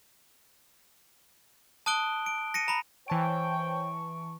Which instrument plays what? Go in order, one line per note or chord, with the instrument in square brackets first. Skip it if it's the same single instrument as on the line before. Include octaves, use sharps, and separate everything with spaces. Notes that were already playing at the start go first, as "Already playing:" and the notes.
[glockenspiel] A5 D#6 F#6 D7 G7
D7
A#6 C#7 D#7
A#5 B5
[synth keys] E3 A5 D7 [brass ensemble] C5 C#5 G5 [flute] C#6